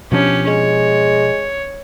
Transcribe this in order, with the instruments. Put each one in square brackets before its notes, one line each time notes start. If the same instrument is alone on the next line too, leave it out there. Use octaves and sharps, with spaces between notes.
[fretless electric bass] B2 F3 D4 [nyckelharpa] C#4 G4
[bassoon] G#3 [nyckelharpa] C#5